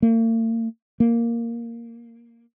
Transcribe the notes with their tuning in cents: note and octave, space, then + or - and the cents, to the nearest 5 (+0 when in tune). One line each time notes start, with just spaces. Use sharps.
A#3 -45
A#3 +0